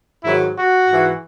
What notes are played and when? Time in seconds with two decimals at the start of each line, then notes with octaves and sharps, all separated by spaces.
0.24 G#2 D#3 F#3 E4
0.56 F#4
0.88 G#2 E3